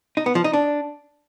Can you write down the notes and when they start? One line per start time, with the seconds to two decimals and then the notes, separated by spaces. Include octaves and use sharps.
0.17 D#4
0.26 B3
0.35 F3
0.44 D#4
0.53 D4